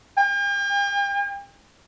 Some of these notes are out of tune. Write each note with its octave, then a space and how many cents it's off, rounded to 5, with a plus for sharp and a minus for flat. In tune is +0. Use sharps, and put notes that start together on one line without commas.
G5 +45